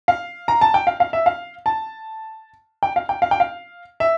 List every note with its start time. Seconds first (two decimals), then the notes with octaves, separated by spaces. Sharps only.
0.08 F5
0.48 A#5
0.61 A5
0.74 G5
0.87 F5
1.00 F5
1.13 E5
1.26 F5
1.66 A5
2.83 G5
2.96 F5
3.09 G5
3.22 F5
3.31 G5
3.40 F5
4.00 E5